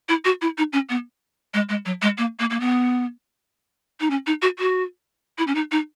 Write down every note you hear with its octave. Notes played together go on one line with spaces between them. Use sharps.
E4
F#4
E4
D#4
C#4
B3
G#3
G#3
F#3
G#3
A#3
A#3
A#3
B3
D#4
C#4
D#4
F#4
F#4
E4
C#4
D#4
D#4